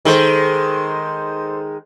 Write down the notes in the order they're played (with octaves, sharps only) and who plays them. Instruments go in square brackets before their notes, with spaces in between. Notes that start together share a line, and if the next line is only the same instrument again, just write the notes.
[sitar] D#3 G#3 [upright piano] A4 C5